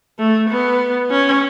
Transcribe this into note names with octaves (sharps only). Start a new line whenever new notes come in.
A3
B3
C#4